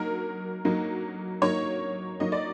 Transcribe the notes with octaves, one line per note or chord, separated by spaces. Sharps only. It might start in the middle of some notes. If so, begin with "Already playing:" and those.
Already playing: F#3 A#3 D#4 A#4
F#3 A#3 D#4
F#3 A#3 D#4 C#5
F#3 A#3 D#4 D#5
D5